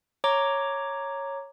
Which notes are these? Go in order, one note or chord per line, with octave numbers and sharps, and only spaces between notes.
C#5 A#5 D6